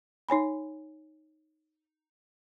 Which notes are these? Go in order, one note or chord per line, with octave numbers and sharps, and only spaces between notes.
D#4 C#5 G#5 B5